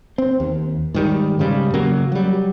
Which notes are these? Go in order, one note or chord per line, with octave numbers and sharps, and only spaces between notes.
C4
D#2
G#2 D#3 G3
G#2 C#3 G3
C#3 F#3 A#3
F#3 G3